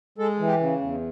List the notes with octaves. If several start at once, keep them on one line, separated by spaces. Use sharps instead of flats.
G#3 A4
E3
G4
C#3
E2